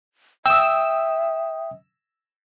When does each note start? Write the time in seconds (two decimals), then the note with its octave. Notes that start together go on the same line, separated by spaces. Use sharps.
0.46 E5 G5 D#6 E6